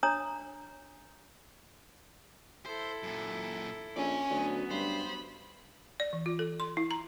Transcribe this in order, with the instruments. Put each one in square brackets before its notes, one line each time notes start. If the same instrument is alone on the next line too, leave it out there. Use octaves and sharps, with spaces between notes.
[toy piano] D4 C#5 A#5 D#6
[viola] E4 A4 [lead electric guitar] C5
[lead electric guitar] F#2 A#2
[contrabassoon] A#1 [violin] C#4 [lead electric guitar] D5 G#5
[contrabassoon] D2 [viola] F#3 B3
[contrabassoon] G2 [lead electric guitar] C5 [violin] B5
[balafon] D5
E3
F4
A4
C6
E4
A#5